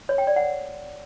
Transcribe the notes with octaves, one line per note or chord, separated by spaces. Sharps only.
C#5
G5
D5
F#5